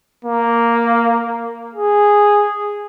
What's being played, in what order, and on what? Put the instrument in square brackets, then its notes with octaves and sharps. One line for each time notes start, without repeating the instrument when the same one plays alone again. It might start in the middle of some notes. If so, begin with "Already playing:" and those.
[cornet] A#3
G#4